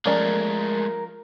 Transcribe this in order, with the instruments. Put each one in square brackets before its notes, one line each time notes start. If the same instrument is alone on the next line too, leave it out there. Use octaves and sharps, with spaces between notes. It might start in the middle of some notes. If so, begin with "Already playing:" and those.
[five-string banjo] F3 C#4 D5 [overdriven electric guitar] G#3 A3 [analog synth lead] A#4